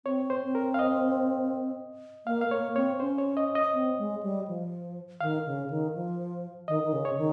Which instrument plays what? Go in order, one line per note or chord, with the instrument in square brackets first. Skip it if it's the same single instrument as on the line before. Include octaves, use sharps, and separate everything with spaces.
[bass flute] C4 [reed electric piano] C#5
[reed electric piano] C5
[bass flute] C4
[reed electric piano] A#4
F5
D#5
[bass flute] A#3 [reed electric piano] F5
[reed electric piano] F5
[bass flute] A#3 [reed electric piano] C#5
[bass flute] C4 [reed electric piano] C#5
[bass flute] C#4 [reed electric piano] C5
[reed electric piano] C#5
D#5
D#5
[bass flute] C4
G#3
G3
F3
[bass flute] D#3 [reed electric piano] F5
[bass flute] C#3
D#3
F3
[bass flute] D#3 [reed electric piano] D#5
[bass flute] D#3
C#3
[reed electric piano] C#5
[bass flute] D#3